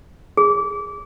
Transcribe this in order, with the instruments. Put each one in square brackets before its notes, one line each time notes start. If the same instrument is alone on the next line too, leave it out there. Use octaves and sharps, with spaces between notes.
[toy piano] G#4